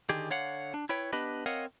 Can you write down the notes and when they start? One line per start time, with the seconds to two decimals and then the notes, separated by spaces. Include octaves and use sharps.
0.09 D3 D#3 G4 G#4
0.31 D3 C#5 F5 F#5
0.74 D4
0.89 E4 B4 C#5 G5
1.13 B3 D4 G4 B4 D#5 B5
1.46 C4 A#4 C#5 D#5 F5 F#5